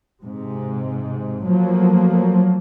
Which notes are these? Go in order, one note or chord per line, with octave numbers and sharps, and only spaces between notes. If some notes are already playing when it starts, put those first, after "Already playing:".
G#2 C3
F3 F#3 A3 A#3